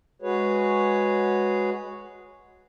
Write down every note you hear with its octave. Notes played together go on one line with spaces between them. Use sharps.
G#3 F#4 G#4 B4 C#5